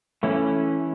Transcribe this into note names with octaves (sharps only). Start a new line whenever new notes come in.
E3 A3 C#4 E4